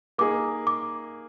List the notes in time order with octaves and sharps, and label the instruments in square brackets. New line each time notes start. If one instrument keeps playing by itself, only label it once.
[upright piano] A#3 D#4 G#4 [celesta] D6
[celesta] D6